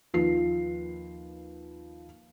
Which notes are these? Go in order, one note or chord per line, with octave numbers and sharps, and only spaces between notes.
D#2 F3 F4 B4 C7